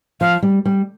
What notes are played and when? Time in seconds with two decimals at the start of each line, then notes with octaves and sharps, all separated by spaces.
0.21 F3 F5
0.42 G3
0.65 G3